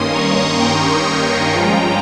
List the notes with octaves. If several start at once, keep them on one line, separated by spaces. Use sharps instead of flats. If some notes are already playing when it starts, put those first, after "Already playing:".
Already playing: G2 D#3 A#3 C#4 C6 D#6
A#5 C#6
G5 A#5
G2 F3 G#3 C#4 F4